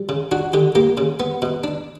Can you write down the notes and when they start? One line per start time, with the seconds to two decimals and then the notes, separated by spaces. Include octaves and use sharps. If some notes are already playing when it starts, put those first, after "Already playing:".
Already playing: G3
0.09 C#3
0.32 D4 F#4
0.53 D3 G4
0.75 A#3 G4
0.97 C#3
1.20 B3
1.42 B2
1.64 D4